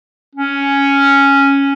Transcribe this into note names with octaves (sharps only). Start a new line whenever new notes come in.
C#4